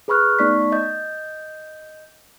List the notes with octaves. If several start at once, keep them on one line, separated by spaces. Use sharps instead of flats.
G#4 B4 B5 C#6 F6 F#6
A3 B3 D#4 D5 C#6 B6
D#5 G6